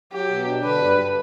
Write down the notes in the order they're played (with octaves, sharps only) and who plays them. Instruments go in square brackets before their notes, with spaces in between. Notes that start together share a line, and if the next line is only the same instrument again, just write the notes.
[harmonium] F#3 [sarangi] G4
[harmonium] B2
D4
[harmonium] D3 [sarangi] B4
[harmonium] G2